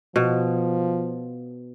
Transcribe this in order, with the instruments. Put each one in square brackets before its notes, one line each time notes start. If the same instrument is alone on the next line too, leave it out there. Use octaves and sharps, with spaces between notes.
[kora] B2 [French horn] F3